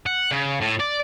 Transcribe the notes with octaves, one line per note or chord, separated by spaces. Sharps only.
F#5
C#3
A2
D5